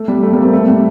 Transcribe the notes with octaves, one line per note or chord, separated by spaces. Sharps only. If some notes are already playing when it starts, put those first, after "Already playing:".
Already playing: A3
G3
A3
G3 A#3
A3 C4
A3
G3